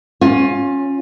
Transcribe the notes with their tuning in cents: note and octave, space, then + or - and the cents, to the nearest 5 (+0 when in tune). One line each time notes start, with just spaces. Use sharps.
C#4 -5 F4 +25